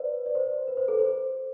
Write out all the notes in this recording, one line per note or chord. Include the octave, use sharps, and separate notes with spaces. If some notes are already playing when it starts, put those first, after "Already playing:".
Already playing: B4 C5 D5
D5
C5
B4
C5
A4
C5